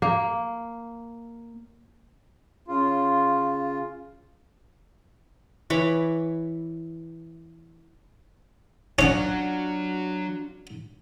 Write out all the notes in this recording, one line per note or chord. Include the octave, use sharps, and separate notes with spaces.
A#3
C#3 F4
E3 C#5 B5 D6
F#3 C#4 D4 F4 F#5